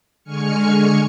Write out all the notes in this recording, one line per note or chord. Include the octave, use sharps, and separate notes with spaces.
D3 G#3 G#5 C#6 F6 C#7